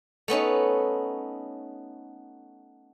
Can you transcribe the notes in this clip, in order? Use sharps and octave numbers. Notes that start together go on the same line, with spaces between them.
A3 B3 C#4 D#4